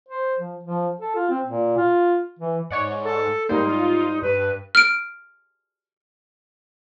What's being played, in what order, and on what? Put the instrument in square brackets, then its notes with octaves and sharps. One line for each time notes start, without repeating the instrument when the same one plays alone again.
[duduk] C5
F3
F3
A4
F4
C4
A#2
F4
E3
[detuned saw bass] G#2 [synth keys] C#5 D5 F#5
[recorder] A4
[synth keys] G#2 G3 C5 [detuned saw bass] A#3 [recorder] D#4
[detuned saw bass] F4
[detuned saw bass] G2 [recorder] B4
[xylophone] F6 D7